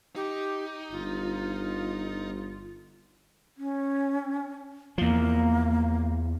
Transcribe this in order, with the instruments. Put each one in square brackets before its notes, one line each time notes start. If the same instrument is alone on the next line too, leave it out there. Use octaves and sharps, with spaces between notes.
[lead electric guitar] D#4 [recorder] G4
[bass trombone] G1 [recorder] F4
[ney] C#4
[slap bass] E2 F3 [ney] A#3